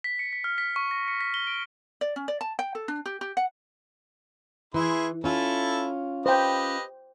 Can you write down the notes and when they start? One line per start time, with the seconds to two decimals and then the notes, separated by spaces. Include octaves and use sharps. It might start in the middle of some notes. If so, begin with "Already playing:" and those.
0.04 B6
0.19 C#7
0.33 B6
0.44 F6
0.58 B6
0.76 C#6
0.91 A#6
1.08 C#7
1.21 B6
1.34 G7
1.47 D7
2.01 D5
2.16 C#4
2.28 D5
2.41 A5
2.59 G5
2.75 A4
2.88 D4
3.06 G4
3.21 G4
3.37 F#5
4.74 E3 E4 G#4 C6
5.24 C#4 E4 F4 A4
6.26 G4 B4 C5 D#5 G5